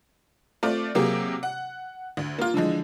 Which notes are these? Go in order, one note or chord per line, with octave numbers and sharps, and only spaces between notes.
A3 C4 F4 D5
C3 F#3 A#3 G4 G#4
F#5
D2
A#3 F4
D3 E3 F3 G#3